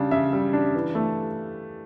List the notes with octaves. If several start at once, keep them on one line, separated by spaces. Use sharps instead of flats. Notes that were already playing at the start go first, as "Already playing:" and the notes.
Already playing: C#3 G3 D4
C#3 E5
G3
D4
E3
A3